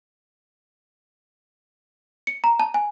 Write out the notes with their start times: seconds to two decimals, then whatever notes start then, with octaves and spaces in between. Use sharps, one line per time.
2.27 C#7
2.44 A#5
2.60 A5
2.74 G#5